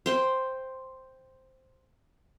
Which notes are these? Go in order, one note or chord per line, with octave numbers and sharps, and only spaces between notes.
C5 G5